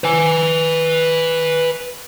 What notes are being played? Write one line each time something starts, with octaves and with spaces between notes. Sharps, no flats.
B4 G#5